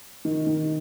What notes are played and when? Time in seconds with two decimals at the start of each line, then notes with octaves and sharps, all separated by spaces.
0.25 D#3
0.47 D#3